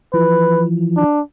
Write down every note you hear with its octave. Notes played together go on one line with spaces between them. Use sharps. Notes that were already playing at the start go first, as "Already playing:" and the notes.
E3 F3 B4
D4